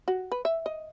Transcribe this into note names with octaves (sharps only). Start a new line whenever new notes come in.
F#4
B4
E5
D#5